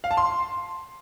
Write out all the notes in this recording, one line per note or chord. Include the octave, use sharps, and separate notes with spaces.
F5
A5
C6